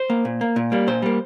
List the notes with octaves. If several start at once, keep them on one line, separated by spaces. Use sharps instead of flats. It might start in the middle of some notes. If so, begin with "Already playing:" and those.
Already playing: C5
A#3
A#2
A#3
A#2
G3 A#3
A#2 C5
G3 A#3